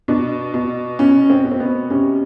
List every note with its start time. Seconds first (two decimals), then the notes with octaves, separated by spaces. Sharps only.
0.08 B2 D4
0.54 B2
0.99 B2 C#4
1.30 C4
1.44 B2
1.52 C4
1.60 B3
1.90 C3 C#4